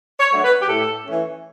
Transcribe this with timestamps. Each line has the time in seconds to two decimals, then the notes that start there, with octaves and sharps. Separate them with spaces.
0.19 C#5
0.31 F#3 A3 D4
0.44 B4
0.62 G4
0.69 A2 A4
1.06 E3 A3 C#4